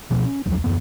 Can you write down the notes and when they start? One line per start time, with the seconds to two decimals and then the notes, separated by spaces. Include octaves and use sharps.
0.11 B2 F3 A3
0.24 C#4
0.46 B1 E2 F3 F#3
0.64 D#1 F#2 E3 B3